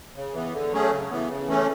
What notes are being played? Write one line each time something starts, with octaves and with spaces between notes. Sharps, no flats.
C#3
E3 B3
D3
F#3 A3 C#4 G#4
C#3
E3 B3
C#3
E3 A3 C#4